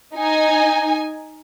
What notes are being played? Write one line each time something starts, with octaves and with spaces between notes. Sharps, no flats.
D#4 G#5